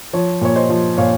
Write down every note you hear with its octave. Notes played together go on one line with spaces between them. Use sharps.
F3 C#5
A#2 C#5
C5 D#5
F3
A#2 C#5 F5